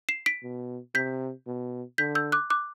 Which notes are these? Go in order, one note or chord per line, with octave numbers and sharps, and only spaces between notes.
C7 E7
B6 D7
B2
C3 G6 B6
B2
D3 G6 B6
E6 G6
D6 F#6
D6 F#6